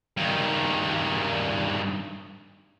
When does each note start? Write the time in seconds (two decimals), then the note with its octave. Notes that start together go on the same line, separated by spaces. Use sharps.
0.17 G2 D#3